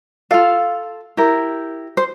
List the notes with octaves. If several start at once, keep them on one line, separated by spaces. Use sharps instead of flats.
F4 A4 F5
E4 G4 A#4
C5